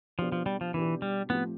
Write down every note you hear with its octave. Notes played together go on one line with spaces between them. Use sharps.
B2 F3 B3 D4 G4
F3
G3
F3
B2 E3 B3 D4 G4
G3
A2 F3 A3 B3 C4 G4